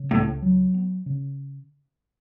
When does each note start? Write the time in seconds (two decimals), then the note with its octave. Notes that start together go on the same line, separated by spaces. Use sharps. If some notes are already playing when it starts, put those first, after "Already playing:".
Already playing: C#3
0.11 C#2 A2
0.42 F#3
0.74 B3
1.06 C#3